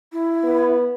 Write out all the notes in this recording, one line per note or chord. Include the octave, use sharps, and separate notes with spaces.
E4
B3